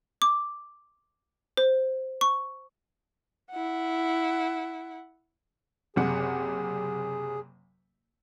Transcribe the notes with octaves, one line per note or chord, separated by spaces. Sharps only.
D6
C5
C#6
E4 F#5
F#1 C3 G#4 F#5